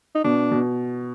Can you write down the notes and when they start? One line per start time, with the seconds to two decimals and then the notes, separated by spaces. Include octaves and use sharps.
0.15 D#4
0.24 B2 D4
0.52 B2